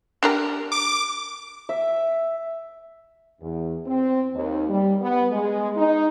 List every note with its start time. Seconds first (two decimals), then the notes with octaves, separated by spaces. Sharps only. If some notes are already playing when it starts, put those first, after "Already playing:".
0.23 D4 G4 A#4
0.72 D6
1.69 E5
3.41 E2
3.86 C4
4.34 D#2
4.69 G3
5.01 B3
5.31 G#3
5.76 D#4